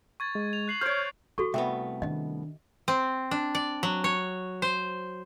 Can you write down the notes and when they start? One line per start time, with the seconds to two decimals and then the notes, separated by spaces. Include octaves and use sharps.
0.20 C#6 G#6 A6
0.35 G#3
0.53 F7
0.68 F#6 C7 F#7
0.81 C5 C#5 F6 G6 D7
1.38 E4 F#4 A4 C#6
1.54 C2 A3 B3 E5 G5
2.02 D#3 D4 D#5
2.88 C4
3.31 D4
3.55 D5
3.83 F#3
4.04 C#5
4.62 C5